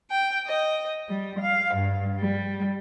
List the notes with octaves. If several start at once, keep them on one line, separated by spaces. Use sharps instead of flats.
G5
D#5
G3
F5
G2
G3